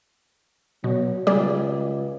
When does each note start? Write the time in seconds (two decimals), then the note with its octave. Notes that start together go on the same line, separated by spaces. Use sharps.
0.84 B2 F#3
1.27 C#2 G3 G#4 D5